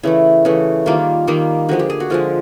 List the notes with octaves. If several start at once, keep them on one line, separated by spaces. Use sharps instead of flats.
C#3 E3 A3 E4
C#3 E3 A3
D#3 G3 A#3 F4
D#3 G3 A#3
D3 F3 G#3 F#4
G4
G#4
F#4
D3 F3 G#3 F4